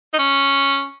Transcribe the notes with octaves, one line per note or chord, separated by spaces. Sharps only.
D#4
C#4